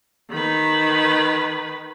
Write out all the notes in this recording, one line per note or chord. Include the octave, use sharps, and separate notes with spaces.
D#3 B4